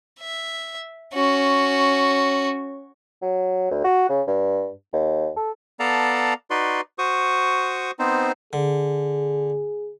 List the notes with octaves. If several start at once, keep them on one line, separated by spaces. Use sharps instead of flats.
E5
C#4 F#4
F#3
D2
F#4
C#3
G2
D#2
A4
B3 A4 D5 F5 A5 A#5
D#4 F#4 B4 D5 C6
F#4 C5 C#6 D#6
B3 C4 D#4 C5
D3 G#4